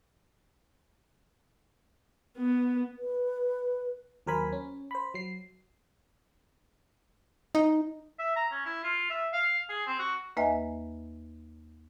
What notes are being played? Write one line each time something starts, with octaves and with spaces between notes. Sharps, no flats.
B3
B4
D#2 F#3 A#4 C5 G#5 B5
C#4
C5 B5
F#3 C7
D#4
E5
A#5
C#4
E4
F4
E5
F5
G#4
C4
F#4
D#2 A#3 B4 D#5 E5 G#5